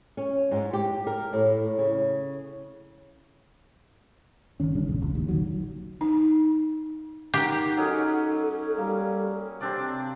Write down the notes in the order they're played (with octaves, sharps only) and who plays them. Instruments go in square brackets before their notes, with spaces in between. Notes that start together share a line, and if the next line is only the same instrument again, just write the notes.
[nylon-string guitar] C#4
G#2
G4
A#4
A2
C#3
[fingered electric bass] G1 E2 D#3 C#4
C#3 G3 D4
A#1 E2 C#3
F1 C#2
A1 D#2
A#1 D#3 F#3
[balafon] D#4
[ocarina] D#4 [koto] G4 [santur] A#4 F#5
[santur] F#3 C#4 G#4 [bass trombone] D#4 [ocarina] A4
[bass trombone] G3 [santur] A#3
[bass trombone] C3 [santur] C4 D4 D5